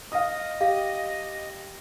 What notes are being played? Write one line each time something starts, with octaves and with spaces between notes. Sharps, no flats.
D#5 F5 D#6
G4 F5